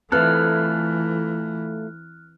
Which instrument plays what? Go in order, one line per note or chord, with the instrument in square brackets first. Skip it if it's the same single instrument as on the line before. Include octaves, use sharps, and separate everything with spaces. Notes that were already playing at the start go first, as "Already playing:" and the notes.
[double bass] E3 [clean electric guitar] A3 F4 A4 [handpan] C4 B4 [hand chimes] F6 F#6